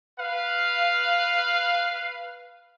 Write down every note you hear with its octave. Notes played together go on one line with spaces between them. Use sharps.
B4 F5